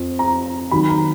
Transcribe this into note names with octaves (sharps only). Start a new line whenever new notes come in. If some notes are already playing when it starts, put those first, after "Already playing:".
Already playing: F2
A#5
D#2 D#3 F#3 B5
A#5